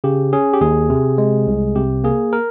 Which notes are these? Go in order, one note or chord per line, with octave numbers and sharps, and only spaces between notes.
C#3 G4
C#4 G#4
G4
D#2 G#4
C3
G#3
C2
C3 G4
A#3 G#4
A#4